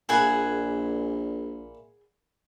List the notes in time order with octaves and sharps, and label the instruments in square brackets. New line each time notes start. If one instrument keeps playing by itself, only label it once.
[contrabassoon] A#1 [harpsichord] A#2 E4 [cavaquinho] G#4 F#5 G#5